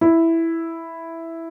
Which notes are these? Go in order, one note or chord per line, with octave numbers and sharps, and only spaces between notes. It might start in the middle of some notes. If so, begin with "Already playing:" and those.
E4